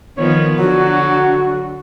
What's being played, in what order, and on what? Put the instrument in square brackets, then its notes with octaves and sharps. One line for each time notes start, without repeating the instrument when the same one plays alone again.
[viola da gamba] D#3 F3 B3 [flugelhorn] C#5
[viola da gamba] D3 [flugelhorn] F#3 [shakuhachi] F#4